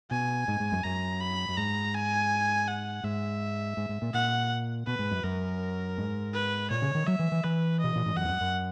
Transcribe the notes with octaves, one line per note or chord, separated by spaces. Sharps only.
B2 G#5
G#2
G#2
F#2
F#2 A#5
B5
F#2
G#2 A#5
G#5
F#5
G#2 E5
G#2
G#2
A#2
A#2 F#5
B2 B4
G#2
F#2
F#2 A#4
G#2
B4
A#2 C#5
C#3
D#3
F#3 E5
E3
E3
E3 B4
B2 D#5
A#2
G#2
F#2 F#5
E2
F#2
F#2